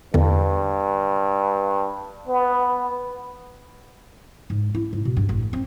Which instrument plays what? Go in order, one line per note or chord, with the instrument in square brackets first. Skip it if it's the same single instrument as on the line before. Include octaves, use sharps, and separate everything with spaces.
[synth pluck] E2 D3 [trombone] G2
[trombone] B3
[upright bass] G#2
E4
G#2
B2
G2
A1
C4